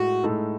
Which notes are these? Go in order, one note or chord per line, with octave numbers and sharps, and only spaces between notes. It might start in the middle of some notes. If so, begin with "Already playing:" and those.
Already playing: A2 G#3 F#4
A2 G#3 D#4 A4